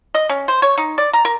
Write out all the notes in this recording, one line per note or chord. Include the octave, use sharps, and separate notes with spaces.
D#5
C#4
C5
C#5
D#4
D5
A#5
A#4